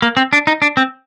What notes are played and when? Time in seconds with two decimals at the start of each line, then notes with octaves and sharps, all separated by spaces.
0.02 A#3
0.17 C4
0.33 D4
0.47 D#4
0.62 D4
0.77 C4